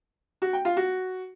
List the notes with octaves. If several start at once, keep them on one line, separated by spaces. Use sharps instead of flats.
F#4
G5
F4
F#4